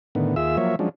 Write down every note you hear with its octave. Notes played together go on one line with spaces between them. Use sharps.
A2 D3 D#3 B3
D#2 F4 G#4 E5 E6
F3 F#3 A#3 C#5 E5
F3 F#3 G#3 C#4 D4